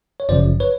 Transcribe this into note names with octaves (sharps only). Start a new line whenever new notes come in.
C#5
G1 F#2 C#3 F3 C5 D5
B4 C#5